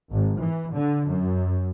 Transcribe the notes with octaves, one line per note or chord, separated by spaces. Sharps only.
G#1
E3
D3
F#2